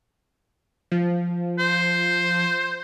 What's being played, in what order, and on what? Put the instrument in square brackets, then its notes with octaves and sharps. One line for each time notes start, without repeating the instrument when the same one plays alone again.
[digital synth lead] F3
[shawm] C5